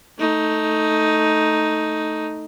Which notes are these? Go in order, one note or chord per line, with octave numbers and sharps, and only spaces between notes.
A3 D#4